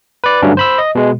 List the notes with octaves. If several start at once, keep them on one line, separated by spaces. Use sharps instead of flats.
B4 D5
G2 D3 F#3 A3 C#4 D4
C5 B5 E6
D#5
B2 G#3